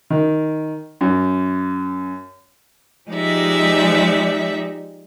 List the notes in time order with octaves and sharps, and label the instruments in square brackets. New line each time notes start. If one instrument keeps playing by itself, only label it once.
[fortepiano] D#3
F#2
[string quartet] F3 G#3 D#4 G4 D5 E5